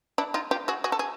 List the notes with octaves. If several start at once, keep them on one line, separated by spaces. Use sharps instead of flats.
D4 E4
D#4 F4
F4 G4
F#4 G#4
F#4 G#4
A4
G#4